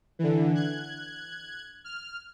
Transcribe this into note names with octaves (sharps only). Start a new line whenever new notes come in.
D3 E3
F#6 G#6
F6